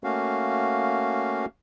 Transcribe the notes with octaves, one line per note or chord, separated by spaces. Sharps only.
A3 A#3 C#4 F#4 F5